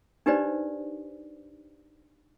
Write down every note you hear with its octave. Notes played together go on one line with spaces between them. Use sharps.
D4 D#4 G4 B4 C5 D5